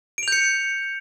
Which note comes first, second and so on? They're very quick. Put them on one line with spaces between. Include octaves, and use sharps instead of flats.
D7 F7 G6 C#7